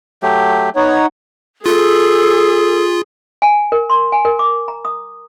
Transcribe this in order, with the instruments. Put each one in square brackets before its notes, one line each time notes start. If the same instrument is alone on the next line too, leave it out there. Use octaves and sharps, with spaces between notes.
[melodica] F#3 A3 G4
[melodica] B3 [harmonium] D#4 C#5 F#5
[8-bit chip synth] F4 [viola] G#4 [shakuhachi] A4
[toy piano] G#5
A#4
C6
G#5
A#4
D6
A#5
D#6